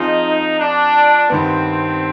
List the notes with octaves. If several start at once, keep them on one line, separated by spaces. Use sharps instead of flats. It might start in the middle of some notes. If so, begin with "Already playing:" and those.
Already playing: F3 C4 D#4 F4 G#4
D4
G2 D#3 B3 C4